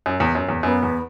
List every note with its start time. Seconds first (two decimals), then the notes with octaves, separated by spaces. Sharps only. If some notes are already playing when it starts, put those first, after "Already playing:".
0.06 F#2
0.20 E2
0.35 F#2
0.48 E2
0.63 F#2 B3
0.83 E2